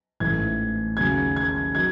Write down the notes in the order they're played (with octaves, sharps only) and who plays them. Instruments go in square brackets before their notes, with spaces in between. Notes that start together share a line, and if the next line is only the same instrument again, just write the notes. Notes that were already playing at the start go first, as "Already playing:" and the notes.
[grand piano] A1 G#2 E3 A3 G#6
D#2 C#3 F#3 G#6
G#6
D#3 F#3 G#6